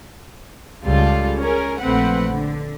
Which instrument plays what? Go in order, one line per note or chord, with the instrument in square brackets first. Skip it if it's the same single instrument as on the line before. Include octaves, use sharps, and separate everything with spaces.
[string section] C#2 G3 F4 A4
C#4 G#4 A#4
A#1 F3 A3 C4 B4 F#5
D3